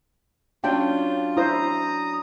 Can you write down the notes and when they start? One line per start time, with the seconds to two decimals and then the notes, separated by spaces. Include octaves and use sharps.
0.64 F#3 C#4 D4 F4 G5
1.37 E4 C5 A#5 D#6